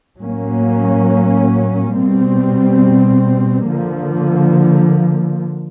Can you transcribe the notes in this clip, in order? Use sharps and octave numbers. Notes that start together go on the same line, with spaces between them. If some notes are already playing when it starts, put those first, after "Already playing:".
A2 F#3 A#3 C#4
B2 G3 C4
D3 F3 A#3